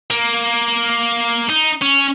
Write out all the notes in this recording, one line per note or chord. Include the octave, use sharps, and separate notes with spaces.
A#3
D#4
C#4